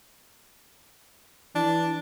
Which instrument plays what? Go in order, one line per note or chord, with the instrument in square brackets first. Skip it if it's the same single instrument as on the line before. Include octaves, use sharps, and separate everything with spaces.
[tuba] E3 [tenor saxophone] D4